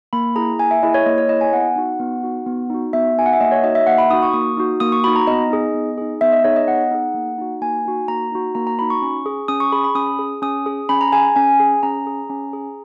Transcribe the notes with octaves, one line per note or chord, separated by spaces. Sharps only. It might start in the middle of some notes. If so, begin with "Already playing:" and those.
A#3 B5
E4 G#4 A#5
A#3 G#5
E5
E4 G#4 D#5
C#5
A#3 D#5
C#5
E4 G#4 D#5
G#5
B3 F#5
D#4 F#4
B3
D#4 F#4
B3
D#4 F#4
B3 E5
D#4 F#4 G#5
F#5
E5
A#3 D#5
C#5
D#4 F#4 D#5
E5
A#3 F#5
B5
D#4 F#4 D#6
C#6
A#3 D#6
D#4 F#4
A#3 D#6
C#6
D#4 F#4 B5
A#5
B3 D#5
D#4 G#4
B3
D#4 G#4
B3 E5
D#5
D#4 G#4 C#5
D#5
B3 F#5
D#4 G#4
A#3
D#4 F#4
A#3 G#5
D#4 F#4
A#3 A#5
D#4 F#4
A#3 A#5
A#5
D#4 F#4 B5
C#6
C#4
G#4
C#4 D#6
C#6
G#4 B5
B5
C#4 D#6
G#4
C#4 D#6
G#4
C#4 B5
A#5
G#4 G#5
C#4 G#5
G#4
C#4 A#5
G#4
C#4
G#4